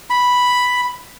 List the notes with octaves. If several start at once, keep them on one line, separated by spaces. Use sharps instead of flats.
B5